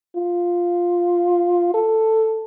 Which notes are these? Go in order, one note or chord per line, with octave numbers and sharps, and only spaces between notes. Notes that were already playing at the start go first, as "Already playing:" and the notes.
F4
A4